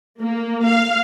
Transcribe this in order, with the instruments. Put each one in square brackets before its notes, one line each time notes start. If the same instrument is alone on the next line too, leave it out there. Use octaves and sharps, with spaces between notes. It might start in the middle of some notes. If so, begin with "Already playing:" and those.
[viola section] A#3
F5